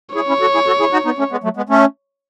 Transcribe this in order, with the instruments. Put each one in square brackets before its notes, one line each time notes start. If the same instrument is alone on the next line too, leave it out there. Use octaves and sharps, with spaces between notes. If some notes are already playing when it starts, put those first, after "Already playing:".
[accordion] E4 G#4 [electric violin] C#5
[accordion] C#4 E4
F#4 A4
E4 G#4
F#4 A4
E4 G#4
D#4 F#4
B3 D#4
A3 C#4
G#3 B3
F#3 A3
G#3 B3
A3 C#4